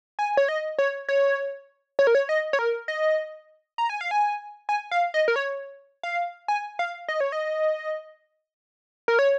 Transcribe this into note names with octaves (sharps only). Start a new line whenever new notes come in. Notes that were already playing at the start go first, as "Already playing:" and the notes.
G#5
C#5
D#5
C#5
C#5
C#5
A#4
C#5
D#5
C#5
A#4
D#5
A#5
G#5
F5
G#5
G#5
F5
D#5
A#4
C#5
F5
G#5
F5
D#5
C#5
D#5
A#4
C#5